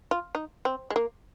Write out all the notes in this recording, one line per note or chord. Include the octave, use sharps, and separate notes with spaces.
F4
D#4
C4
G#3
A#3